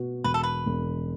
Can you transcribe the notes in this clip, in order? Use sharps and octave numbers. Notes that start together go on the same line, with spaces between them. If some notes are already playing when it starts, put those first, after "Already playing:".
Already playing: B2 F#4
E1 B4
A4
B4
E1